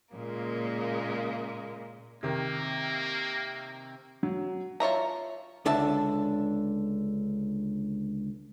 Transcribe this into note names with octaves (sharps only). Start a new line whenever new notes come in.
A#2 C#3 G#3 A#3
C3 D#3 A#3
F#3
F4 C#5 E5 A#5
C#2 D3 D4 E5 A5